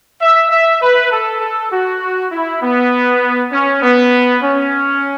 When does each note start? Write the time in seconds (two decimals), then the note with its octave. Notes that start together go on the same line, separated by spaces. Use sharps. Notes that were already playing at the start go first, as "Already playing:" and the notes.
0.21 E5
0.50 E5
0.82 B4
1.11 A4
1.41 A4
1.72 F#4
2.32 E4
2.62 B3
3.52 C#4
3.83 B3
4.43 C#4